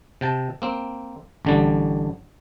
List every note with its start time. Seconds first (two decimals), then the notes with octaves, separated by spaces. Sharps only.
0.21 C3 G5 A5
0.62 A#3 C4
1.45 A1 D3 G3